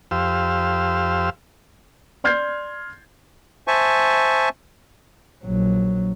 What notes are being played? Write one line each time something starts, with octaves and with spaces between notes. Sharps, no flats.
F2 G4 C5 F5 E6
D5 C6 F6 G6 G#6 C7
C5 E5 G#5 A5 C#6
A#1 F#3